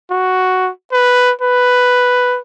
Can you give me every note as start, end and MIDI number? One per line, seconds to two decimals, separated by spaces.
0.11 0.70 66
0.92 1.32 71
1.41 2.39 71